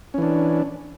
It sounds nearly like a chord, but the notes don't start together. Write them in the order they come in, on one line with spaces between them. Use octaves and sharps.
C#4 E3 D4